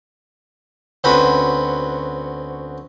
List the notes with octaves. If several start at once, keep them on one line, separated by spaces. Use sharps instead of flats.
D2 C4 C#4 F#4 B4